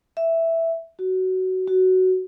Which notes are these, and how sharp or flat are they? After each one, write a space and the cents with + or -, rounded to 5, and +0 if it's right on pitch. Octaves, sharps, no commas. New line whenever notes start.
E5 +0
F#4 +15
F#4 +10